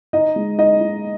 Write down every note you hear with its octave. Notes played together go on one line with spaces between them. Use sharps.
D#4 D#5
G#3
D#4 D#5
D#4